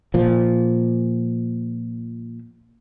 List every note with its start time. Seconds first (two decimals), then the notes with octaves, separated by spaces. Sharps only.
0.14 A#2 F3